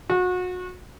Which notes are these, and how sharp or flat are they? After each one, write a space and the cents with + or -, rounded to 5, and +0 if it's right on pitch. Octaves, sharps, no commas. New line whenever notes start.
F#4 -30